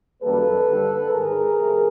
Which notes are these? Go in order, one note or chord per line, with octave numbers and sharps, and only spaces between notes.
F#2 D#3 G3 A#3 A4 B4
G2 D3 G3
G#2 D#3 G#3 G#4 A#4
C3 F3 A3